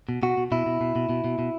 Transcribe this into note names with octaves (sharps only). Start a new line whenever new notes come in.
B2
B2 F#4
B2
B2 E4
B2
B2
B2
B2
B2
B2